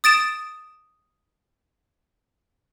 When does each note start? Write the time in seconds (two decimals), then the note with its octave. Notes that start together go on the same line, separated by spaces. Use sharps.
0.04 D#6 A6 D7 E7